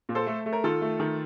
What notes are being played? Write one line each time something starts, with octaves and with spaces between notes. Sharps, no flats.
A#2
A4 C5
A3
A3
A#4
D#3 F4 A4
A3
D#3